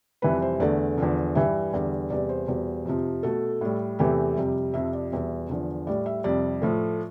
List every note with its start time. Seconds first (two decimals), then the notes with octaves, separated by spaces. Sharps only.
0.22 F2 C3 E3 G3 B4
0.42 C5
0.60 E2 D3 A3 D5
0.98 E2 D3 F3
1.35 G2 E3 G3 E5
1.73 E2 D3 G3
2.10 E2 C3 G3 D5
2.29 C5
2.48 E2 B2 G3
2.85 F2 C3 F3
3.23 B2 A3 A4
3.61 A2 G3
3.99 E2 C3 E3 A3 G4
4.37 F2 C3 G3
4.74 F2 C3 F3 E5
4.93 D5
5.12 E2 B2 G3 E5
5.49 E2 D3 F3
5.87 A2 G3 D5
6.06 E5
6.24 F2 C3 G3 D5
6.62 A2 F3 A3